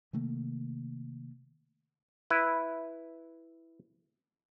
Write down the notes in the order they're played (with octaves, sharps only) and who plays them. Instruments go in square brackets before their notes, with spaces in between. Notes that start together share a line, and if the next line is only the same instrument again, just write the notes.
[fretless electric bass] C3 D#3 A3 A#3
[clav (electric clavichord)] E4 B4